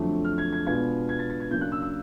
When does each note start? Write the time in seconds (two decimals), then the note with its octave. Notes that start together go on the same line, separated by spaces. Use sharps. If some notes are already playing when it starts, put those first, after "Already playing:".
Already playing: F2 D3 F#3 A3
0.25 F6
0.38 G#6
0.53 G#6
0.66 B2 G#3 B3 D4 F4 G#6
1.09 G#6
1.19 A6
1.30 A6
1.40 G#6
1.51 C#3 F#3 A#3 D4 G6
1.61 F#6
1.72 E6
1.82 E6